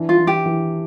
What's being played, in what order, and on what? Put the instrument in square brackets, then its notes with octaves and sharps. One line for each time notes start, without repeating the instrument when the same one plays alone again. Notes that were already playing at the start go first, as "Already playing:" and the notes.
Already playing: [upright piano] E3 D4
[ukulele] F4
[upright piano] E3
[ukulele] G4
[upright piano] E3